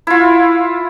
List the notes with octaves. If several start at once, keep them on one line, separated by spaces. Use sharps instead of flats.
E4 F4